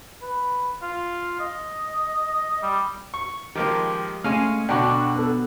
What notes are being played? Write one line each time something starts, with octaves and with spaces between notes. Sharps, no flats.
B4
F4
D#5
G3
C#6
D#3 F3 G#3 A#3 G4
G#3 A3 C#4 F5 G#5
B2 D3 D4 F#4 G5 A#5 C#6
B3 A4